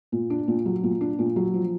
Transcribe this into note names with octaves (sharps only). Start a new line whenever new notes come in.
A#2
D4
A#2
F#3
A#2
D4
A#2
F#3
F3